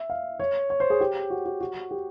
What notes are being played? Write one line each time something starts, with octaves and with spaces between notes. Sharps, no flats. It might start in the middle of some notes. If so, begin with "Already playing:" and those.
Already playing: E5
F5
C#5
C#5
C5
G#4
G4
F#4
F#4
F#4
G4